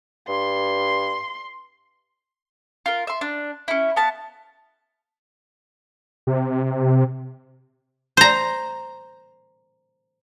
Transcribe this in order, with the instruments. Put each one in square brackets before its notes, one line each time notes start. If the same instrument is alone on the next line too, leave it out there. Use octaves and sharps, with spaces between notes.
[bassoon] G2 [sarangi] C6
[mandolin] F4 A#4
E5 C6
D4
C#4 E4
B3 F5 A5
[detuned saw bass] C3
[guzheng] C5 A#5